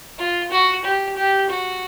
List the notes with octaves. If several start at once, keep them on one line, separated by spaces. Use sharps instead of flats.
F4
F#4
G4
G4
F#4